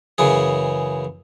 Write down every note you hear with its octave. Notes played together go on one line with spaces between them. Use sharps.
F#2 C#3 E3 G#4